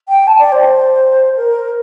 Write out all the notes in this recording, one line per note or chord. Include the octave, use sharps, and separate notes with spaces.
G5
A5
D5
C5
A#4